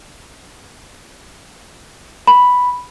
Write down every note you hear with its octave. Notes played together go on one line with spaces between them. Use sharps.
B5